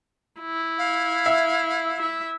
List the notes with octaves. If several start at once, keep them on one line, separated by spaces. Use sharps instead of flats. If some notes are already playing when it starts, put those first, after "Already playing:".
E4
F5
E5
E4 E5